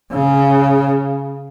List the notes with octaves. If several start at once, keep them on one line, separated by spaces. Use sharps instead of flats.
C#3